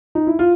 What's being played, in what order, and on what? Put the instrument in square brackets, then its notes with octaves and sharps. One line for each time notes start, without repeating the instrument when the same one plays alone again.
[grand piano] D#4
E4
F4